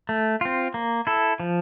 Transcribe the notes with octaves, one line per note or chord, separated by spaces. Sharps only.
A3
C4 F4
A#3
E4 A4
F3